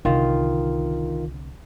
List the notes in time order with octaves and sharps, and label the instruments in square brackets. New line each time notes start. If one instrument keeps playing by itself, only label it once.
[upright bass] C2 D3 [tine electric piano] D#3 F4